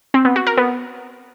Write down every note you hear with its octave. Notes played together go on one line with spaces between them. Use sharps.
C4
B3
F#4
A#4
B3